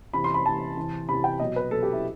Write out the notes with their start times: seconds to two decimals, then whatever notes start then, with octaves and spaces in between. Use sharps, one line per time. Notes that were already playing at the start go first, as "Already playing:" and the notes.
0.14 C3 E3 B5
0.24 C6
0.34 B5
0.45 C3 E3 A5
0.77 C3 E3
1.08 C3 E3 B5
1.24 G5
1.40 B2 F#3 D#5
1.56 B4
1.71 B2 F#3 A4
1.83 G4
1.93 E4